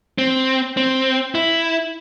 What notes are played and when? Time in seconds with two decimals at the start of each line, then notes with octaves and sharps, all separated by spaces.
0.18 C4
0.77 C4
1.35 E4